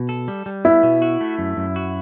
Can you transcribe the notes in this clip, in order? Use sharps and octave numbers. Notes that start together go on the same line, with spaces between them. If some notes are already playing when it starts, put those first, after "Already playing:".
Already playing: B2
A4
G3
G3
B3 E4
B2
F#4
A3
F#2
F#2
F#4